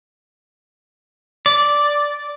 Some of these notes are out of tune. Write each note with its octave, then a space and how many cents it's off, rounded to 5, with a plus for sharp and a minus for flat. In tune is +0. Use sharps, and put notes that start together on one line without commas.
D5 -5